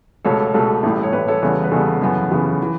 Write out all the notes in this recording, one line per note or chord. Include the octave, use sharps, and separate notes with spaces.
C#2 B2 A3 A4 C#5
C#2 B2 A3 A4
A1 A2 G3
C#5
A1 A2 G3 B4
A4 C#5
E2 C#3 G3 B3
B4
E2 C#3 G3 B3 A4
F#2 C#3 E3 B3
F#2 C#3 E3 B3
E3